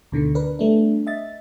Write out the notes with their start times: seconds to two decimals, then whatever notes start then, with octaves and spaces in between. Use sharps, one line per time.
0.12 D2 B2 D3 D#3
0.35 D4 A#4 B4
0.59 G3 A3 B3 D4
1.07 D#5 E5 A6